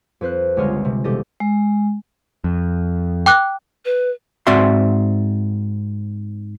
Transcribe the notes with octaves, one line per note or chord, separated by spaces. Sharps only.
F2 B4 C5 F#6
G1 C#2 G#3 C#5 D#5 F6
C3
E1 G4 A4 D#5 A#6
G#3
F2
G5 D6 F#6
B4
G#2 C4 F#4 D5 E5 C6